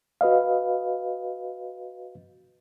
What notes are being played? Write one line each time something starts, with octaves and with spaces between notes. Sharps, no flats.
F#4 B4 D#5 F5